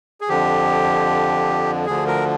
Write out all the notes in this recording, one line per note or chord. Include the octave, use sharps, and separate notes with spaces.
G#4
F2 D3 F3 G4
D2 D3 F3 G#4
A#4